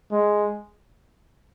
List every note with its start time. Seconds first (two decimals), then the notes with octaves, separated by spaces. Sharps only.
0.11 G#3